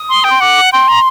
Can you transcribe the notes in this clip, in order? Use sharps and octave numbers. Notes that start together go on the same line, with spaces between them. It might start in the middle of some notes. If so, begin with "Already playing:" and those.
Already playing: D#6
C6
G5
C6
F#5 D6
G5 C6
A#5